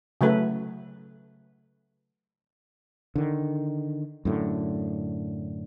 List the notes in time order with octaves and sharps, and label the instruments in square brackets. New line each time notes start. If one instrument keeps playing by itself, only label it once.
[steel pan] C#3 F#3 A3 B4
[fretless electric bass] D3 D#3
F#2 A2 D3